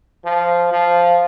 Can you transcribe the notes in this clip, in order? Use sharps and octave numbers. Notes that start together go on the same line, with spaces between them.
F3
F3